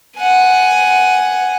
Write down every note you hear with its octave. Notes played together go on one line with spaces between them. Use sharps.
F#5 G#5